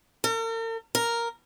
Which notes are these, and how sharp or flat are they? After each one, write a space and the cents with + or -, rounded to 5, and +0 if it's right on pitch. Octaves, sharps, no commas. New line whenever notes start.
A#4 -45
A#4 +0